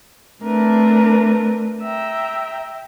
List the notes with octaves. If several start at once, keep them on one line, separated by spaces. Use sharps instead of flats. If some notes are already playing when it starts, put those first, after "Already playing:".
A3 C4 D4 A#4 B4
E5 G5 A#5